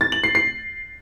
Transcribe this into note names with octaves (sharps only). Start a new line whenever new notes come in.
A6
F#7
C7
C7